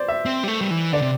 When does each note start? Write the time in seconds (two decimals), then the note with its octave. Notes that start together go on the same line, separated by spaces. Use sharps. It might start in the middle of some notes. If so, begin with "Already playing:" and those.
Already playing: C5 D5
0.08 E5
0.26 C4
0.43 G3
0.48 A3
0.61 G3
0.71 E3
0.92 D3 D5
1.01 C3